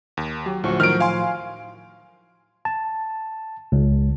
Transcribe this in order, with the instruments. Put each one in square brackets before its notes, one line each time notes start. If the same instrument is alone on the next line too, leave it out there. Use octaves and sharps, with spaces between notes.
[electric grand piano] D#2
[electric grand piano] F#3 [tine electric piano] G4
[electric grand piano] D2 F#4 [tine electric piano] A2 F3 C#6
[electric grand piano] D#3 F#3 [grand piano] F6 D7
[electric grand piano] F5 G#5 C6
[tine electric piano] A5
C#2